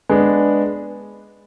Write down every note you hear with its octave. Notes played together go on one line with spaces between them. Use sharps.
G#3 B3 D4